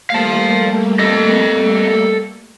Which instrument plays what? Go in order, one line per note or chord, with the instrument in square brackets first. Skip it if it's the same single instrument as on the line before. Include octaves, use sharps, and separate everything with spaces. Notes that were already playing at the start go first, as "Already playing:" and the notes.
[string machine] G3 A3 A#3 [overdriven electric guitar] F5 A5
[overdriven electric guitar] A4 D#5